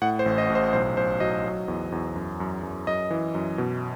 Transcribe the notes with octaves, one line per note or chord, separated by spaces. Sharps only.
A2 F#5
C5
A1
D#5
A1
C5
B1 C5
B1 C5
F#3 D#5
F#3
E2
E2
F#2
F#2
F#2
F#2 D#5
E3
F#2
B2